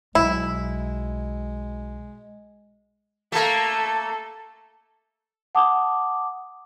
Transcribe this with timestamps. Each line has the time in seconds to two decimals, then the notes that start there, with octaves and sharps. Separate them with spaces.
0.15 B1 G#3 E4
3.32 A3 A#3 A4
5.55 F#5 A5 D6 D#6